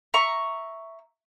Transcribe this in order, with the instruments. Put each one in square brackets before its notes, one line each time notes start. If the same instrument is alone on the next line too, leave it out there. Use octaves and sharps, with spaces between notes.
[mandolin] E5 A#5 C#6